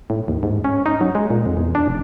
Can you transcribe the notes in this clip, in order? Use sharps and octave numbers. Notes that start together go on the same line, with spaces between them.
A2
D#2
G#2
C#4
D#4
F#3
G#3
A#2
F2
E2
D4
F1